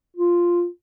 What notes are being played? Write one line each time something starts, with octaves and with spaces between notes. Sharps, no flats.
F4